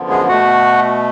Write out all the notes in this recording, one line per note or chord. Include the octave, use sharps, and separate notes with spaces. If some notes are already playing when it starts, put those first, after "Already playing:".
Already playing: F#2 D3 F3 B3
G#3 G#4
B2 A3 F#4 F#5